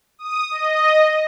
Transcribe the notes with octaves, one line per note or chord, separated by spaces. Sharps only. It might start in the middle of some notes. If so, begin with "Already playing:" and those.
D#6
D#5